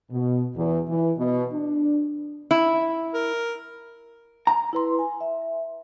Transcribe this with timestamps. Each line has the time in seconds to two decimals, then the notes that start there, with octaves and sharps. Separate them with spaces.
0.11 B2
0.56 E2
0.88 E3
1.18 B2
1.53 D4
2.51 E4
3.14 A#4
4.47 A#5
4.73 E4 B4 C6
4.99 G#5
5.21 E5